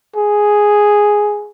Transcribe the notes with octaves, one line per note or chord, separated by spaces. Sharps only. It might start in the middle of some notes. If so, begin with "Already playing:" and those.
G#4